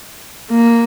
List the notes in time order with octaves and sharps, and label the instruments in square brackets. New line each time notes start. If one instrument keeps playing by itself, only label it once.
[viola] A#3